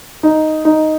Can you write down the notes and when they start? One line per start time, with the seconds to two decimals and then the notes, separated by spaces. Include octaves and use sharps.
0.23 D#4
0.65 D#4